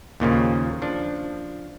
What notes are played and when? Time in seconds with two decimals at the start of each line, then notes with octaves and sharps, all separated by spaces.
0.20 D#2 A#2 C#3 F3
0.82 F3 D4